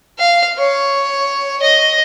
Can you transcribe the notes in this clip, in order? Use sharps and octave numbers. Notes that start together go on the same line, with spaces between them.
F5
C#5
D#5